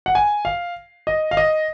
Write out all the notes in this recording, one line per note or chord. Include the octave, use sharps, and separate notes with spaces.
F#5
G#5
F5
D#5
F5
D#5